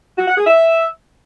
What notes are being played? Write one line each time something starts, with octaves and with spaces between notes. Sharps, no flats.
F#4
F#5
G#4
E5